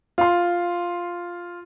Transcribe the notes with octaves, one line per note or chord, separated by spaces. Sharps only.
F4 C6